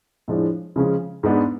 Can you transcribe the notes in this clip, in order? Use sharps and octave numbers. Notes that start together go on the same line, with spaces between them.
A2 F3 G#3 D4
C#3 F3 G#3 C#4
G#2 G#3 B3 D4